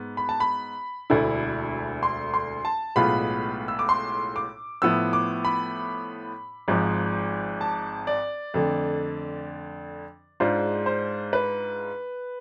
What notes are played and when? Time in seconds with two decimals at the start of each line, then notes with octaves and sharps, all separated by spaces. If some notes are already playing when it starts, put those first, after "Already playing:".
Already playing: G#2 B3
0.17 B5
0.29 A5
0.40 B5
1.10 E1 D2 D3 A3 E4
2.03 C6
2.34 C6
2.65 A5
2.96 B1 A2 G#3 B3 F4 B5
3.68 E6
3.79 D6
3.89 C6
4.36 D6
4.82 A2 F3 B3 E4 E6
5.13 D6
5.45 B5
6.68 G#1 G#2 F3
7.61 A5
8.07 D5
8.54 F2 D3 A3
10.40 G#2 G#3 D4 F4 C5
10.86 C5
11.33 B4